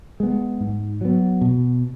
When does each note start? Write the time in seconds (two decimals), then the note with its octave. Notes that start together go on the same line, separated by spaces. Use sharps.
0.20 G#3 B3
0.60 G#2
1.01 F#3 B3
1.41 B2